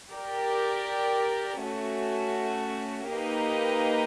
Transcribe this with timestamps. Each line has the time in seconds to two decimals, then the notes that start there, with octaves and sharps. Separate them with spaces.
0.12 G4 A#4 D5
1.60 A3 C#4 F#4
3.09 A#3 D#4 G4 B4 D#5